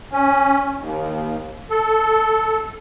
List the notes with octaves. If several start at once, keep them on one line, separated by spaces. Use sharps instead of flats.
C#4
D#2
A4